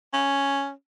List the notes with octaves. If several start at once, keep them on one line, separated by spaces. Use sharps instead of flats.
C#4